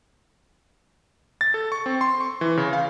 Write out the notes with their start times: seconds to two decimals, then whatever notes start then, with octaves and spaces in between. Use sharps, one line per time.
1.41 A6
1.54 A4
1.72 C#6
1.86 C4
2.01 C6
2.20 C#6
2.41 E3
2.57 C#3
2.73 F5